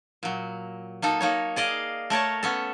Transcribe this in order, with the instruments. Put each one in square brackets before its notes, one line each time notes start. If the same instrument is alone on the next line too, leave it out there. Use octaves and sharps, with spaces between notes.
[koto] A#2 F#3
A#3 D#4 A4
A#3 D#4 C#5
G#4 D5 D#5 F5
A3 A#4 C#5 A5
B3 C#4 A4